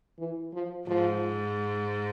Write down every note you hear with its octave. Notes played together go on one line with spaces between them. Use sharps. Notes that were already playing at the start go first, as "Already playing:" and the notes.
E3
F3
G#2 F3